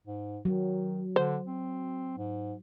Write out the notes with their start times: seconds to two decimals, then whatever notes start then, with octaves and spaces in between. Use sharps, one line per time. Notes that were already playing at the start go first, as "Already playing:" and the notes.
0.07 G#2
0.45 D#3 F#3
1.16 D3 C5
1.46 C4
2.18 G#2